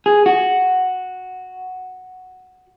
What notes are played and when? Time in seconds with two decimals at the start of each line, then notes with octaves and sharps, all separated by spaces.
0.06 G#4
0.26 F#4